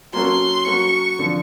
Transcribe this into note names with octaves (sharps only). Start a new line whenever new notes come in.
F#3 A#3 C#4 F#4 A4 C6
F#3 A#3 C#4 F#4 A4 C#6
D3 F3